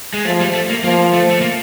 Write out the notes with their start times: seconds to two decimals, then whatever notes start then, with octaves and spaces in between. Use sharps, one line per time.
0.14 G#3
0.25 F3 A3
0.40 G3
0.54 A3
0.69 A#3
0.84 F3 A#3
1.13 A3
1.30 A3
1.41 A#3